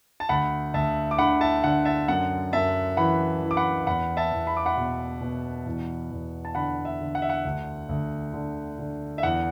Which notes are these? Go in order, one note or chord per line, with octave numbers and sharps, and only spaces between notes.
A5
D2 F#5 B5
D2 E5 A5
D6
D3 F#5 B5
E5 A5
D3 F#5
E5 A5
F#2 F#5
F#2 E5 A5
E3 F#5 B5
E3
D6
F#5 B5
E2 F#5 B5
E5 A5
E2
B5
D6
F#5 B5
B2
B2
E2
E2
A5
D3 F#5 B5
E5
D3
F#5
E5
F#5
D2
D2
D3
D3
E5
E2 F#5